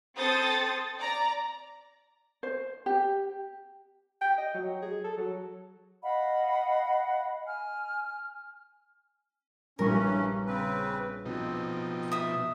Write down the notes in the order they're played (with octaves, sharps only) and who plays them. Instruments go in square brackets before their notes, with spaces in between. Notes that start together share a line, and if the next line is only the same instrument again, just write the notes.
[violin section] C4 A4 C5 D#6 A6
D5 A#5
[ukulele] C5
G4
[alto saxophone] G5
D#5
F#3
G#4
A4
F#3
[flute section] D#5 F5 F#5 B5
G#5 F6
[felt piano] A#1 G3 C#6 [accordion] G2 E3 C#4 [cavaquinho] A#4
[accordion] C#3 C4 B4
[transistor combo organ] B2 F3 D#4 [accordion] C4
[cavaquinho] E5 D#6